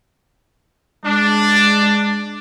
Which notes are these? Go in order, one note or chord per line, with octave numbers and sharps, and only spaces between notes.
G#3 D4